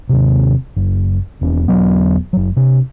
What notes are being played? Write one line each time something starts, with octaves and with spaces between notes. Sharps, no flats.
D#2 C3
F#1
E1 C#4
E1 F#3 B3
F#1 F#3
C3 D4